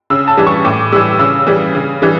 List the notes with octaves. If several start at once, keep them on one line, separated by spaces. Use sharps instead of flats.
C#3 E6
A5
E3 G3
C#6
A2 D6
E3 G3 E6
C#3 E6
E3 G3
C#3
E3 G3